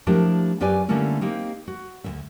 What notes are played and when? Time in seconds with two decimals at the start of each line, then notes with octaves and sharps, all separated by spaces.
0.07 F3 A3 D4 E4 G4 A#4
0.60 F#2 F4 G4 B4 D5 G#5
0.88 D3 G3 A3 A#3 C#4 E4
1.21 A#3 C4 D#4 G4
1.68 F#4
2.04 D2 D#3 E5